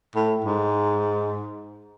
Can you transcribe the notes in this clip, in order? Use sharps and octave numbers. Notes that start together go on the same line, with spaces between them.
A2
G#2